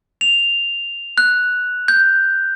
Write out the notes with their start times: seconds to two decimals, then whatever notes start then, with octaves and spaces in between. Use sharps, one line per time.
0.21 F7
1.18 F#6
1.88 G6